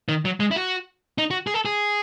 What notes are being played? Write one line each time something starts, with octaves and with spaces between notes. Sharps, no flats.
D#3
F#3
G#3
E4
F#4
D#4
F#4
G#4
A4
G#4